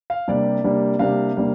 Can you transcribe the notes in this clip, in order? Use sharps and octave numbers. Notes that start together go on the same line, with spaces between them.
F5
C3 G3 A#3 D4 D5
C3 G3 A#3 D4
C3 G3 A#3 D4 F5
C3 G3 A#3 D4